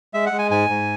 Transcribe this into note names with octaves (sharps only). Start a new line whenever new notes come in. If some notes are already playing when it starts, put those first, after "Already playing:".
G#3 E5
F#5
G#3
G#5
G#2 G#5
G#2